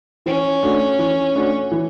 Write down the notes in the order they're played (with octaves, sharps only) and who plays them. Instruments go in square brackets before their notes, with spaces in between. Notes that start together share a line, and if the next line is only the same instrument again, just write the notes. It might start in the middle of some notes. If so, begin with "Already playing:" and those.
[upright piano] E3 [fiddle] C#4
[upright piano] A3 D4 F#4
E3
A3 D4 F#4
E3